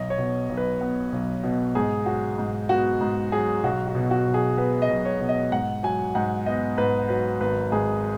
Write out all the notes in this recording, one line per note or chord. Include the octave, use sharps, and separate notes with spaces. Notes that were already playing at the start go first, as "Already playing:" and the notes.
Already playing: B1 D#5
C#5
B2
B1
B4
B3
B1
B2
G#2 G#4
F#3 F#4
G#2
B3 F#4
G#2
F#3 G#4
B1 F#4
F#4
B2
F#4
B1
G#4
B3 B4
D#5
B1
C#5
B2
D#5
G#2 F#5
F#3 G#5
G#2 F#5
B3 D#5
G#2 B4
F#3 B4
G#1 B4
G#2 G#4